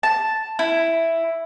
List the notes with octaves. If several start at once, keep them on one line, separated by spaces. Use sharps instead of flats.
A5
E4